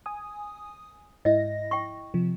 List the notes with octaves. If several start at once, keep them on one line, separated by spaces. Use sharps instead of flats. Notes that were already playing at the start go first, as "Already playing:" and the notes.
G#5 D#6
G#2 E4 D#5 E5 A#6
G5 C#6
C3 F3